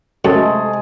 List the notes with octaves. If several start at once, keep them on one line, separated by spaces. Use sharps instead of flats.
F#2 C3 G#3 A3 G#4 A4